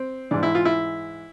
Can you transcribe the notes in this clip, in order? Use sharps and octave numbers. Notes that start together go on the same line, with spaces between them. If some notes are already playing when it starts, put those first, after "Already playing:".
Already playing: C4
G#2 E3 D4
E4
F4
E4